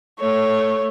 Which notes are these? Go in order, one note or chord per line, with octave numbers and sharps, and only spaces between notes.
A3 C#5